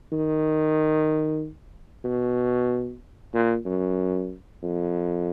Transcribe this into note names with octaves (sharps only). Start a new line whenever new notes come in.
D#3
B2
A#2
F#2
F2